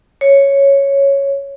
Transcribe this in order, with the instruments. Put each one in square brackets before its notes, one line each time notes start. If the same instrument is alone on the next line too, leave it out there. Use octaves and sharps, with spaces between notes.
[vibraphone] C#5